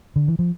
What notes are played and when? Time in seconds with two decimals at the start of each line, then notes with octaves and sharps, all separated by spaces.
0.16 D3
0.28 E3
0.39 F3